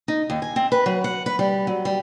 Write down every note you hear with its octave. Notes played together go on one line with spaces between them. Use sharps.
D#4
D#2
G#5
C4
B4
F#3
F#5
B4
G3
F#3
G3